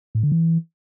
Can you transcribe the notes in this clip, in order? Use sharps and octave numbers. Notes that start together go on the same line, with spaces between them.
A2
D3
E3